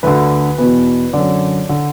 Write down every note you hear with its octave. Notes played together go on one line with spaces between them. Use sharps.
D2 D3 B4
E2 B2 B4
F#2 D3 D5
D3